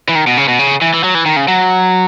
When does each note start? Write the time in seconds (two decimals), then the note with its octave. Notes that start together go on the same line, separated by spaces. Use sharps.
0.09 E3
0.15 D#3
0.27 B2
0.37 C#3
0.48 B2
0.59 C#3
0.82 E3
0.94 E3
1.04 F#3
1.15 E3
1.26 D#3
1.36 C#3
1.48 F#3